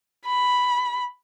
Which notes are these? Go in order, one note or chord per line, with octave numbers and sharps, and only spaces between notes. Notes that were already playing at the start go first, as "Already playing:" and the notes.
B5